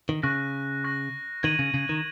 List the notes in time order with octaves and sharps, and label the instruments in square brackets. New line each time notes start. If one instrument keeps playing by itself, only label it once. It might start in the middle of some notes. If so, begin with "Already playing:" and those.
[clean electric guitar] D#3
[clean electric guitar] C#3 [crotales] C#6 F#6 A#6
[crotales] C#6 F#6 A#6
[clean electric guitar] D#3 [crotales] G#6 D#7 F#7
[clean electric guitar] C#3
C#3
D#3